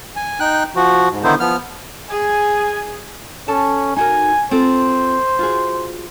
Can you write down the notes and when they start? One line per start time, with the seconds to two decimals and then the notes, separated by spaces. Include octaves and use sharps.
0.16 G#5
0.40 D#4 G5 F#6
0.76 F3 F#4
1.11 G#2
1.24 D3 D#3 B3 D#4 E4 C5
1.40 F3 B3 F6
2.10 G#4 G#5
3.48 C#4 A4 A5
3.96 D#4 F#4 A#4 G#5
4.51 C4 F4 A4 C5
5.39 F4 F#4 G#4